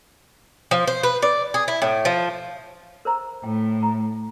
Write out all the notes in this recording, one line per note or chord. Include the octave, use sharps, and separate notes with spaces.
F3
C5
B4
D5
G#4
E4
A2
F3
A#4 C5 A#5
A2 G5
A#5